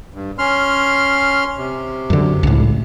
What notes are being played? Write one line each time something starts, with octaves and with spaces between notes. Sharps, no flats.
G2
C#4 C6 F6
C3
F#2 D3
C#2 A2